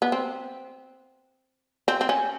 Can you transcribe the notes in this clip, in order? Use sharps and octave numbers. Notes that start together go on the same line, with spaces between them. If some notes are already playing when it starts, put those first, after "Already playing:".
B3
C4
C4
C4
C#4